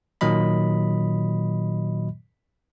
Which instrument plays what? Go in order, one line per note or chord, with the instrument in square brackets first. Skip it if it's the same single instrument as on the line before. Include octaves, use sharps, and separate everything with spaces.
[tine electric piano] A#2 D#3 F#3 D#5 B5